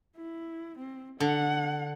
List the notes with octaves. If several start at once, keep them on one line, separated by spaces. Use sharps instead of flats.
E4
C4
D3 F#5